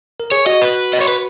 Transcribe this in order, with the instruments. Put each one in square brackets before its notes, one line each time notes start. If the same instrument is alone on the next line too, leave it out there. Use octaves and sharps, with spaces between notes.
[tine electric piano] A#4
[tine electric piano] G#4 [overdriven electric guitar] C#5
[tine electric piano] F#4 [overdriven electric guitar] D#5
[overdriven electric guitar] B4
D#5
C#5
B4